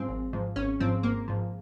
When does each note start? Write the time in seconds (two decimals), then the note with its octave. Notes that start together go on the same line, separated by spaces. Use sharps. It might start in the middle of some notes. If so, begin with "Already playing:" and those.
Already playing: G#2 F3 G#3 C4
0.09 G#1
0.33 G#2 F3
0.56 G#1 C#4
0.80 G#2 F3 C4
1.03 G#1 A#3
1.28 G#2 F3